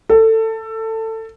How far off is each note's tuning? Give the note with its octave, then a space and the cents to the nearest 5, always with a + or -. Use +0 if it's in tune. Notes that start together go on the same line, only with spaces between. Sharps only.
A4 +20